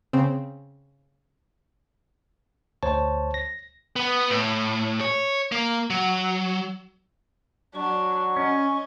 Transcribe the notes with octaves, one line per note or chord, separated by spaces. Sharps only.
C#3 C4
D2 C5 C#5 A5
A#6
B3
A2
C#5
A#3
F#3
F#3 D4 C#6
C#4 D#5